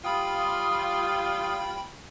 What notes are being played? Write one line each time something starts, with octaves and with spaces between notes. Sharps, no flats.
G3 F4 G5 B5 D#6